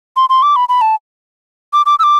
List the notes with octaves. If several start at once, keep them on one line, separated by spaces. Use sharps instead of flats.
C6
C6
D6
B5
B5
A5
D6
D6
E6
D6